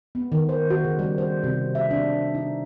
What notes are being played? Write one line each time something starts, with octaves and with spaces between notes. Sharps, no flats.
B3
D#3
C5
F#4
C#3
G3
C5
C3
E5
D4
D#4